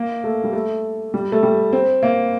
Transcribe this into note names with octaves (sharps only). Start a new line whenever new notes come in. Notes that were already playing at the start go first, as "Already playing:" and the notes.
Already playing: A#3
A3
G3
A3
G3
A3
G3
C4
A#3